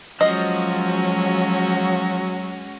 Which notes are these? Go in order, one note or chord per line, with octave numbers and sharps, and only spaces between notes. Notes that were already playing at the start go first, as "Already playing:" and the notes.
F3 F#3 G#3 C#4 F#4 D#5